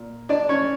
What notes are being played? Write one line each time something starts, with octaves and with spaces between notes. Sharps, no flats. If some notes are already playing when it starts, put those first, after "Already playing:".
Already playing: A#2
D4 D5
C#4 C#5